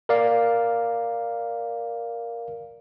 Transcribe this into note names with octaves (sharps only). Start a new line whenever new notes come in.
A#4 D5 F5